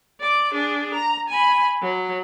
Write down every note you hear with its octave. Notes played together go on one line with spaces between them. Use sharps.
D5 D6
D4 G#4
A#5
G#5 B5
F#3